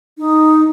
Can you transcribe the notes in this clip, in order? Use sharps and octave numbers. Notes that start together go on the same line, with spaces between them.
D#4